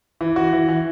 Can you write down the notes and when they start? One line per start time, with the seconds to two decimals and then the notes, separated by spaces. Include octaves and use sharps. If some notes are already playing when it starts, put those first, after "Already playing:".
0.21 E3
0.36 F#4
0.53 E3
0.69 E3